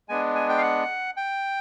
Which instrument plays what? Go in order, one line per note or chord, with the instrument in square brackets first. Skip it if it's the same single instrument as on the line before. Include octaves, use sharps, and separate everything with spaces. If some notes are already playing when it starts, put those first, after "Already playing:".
[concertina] G#3 B3 D4 G#5
G#5
G5
F5
F#5
G5